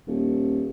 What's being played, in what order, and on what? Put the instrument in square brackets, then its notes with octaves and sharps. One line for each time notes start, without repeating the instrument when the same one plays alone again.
[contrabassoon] D#1